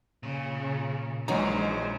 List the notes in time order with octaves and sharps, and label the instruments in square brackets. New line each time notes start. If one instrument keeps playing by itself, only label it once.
[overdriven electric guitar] A#2 [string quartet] C#3
[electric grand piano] A#1 C#5 A#5 [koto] E3 F#3 D#4 [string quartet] G#3 [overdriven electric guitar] C5